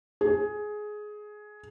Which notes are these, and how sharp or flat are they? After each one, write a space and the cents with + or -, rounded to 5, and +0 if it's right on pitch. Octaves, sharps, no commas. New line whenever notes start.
G#4 +15